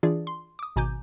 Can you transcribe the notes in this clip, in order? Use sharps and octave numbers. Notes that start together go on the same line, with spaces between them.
E3 D4 F4 G#4 D5
C6
D6 D#6
G#1 B2 G#5 A#5 D6 G6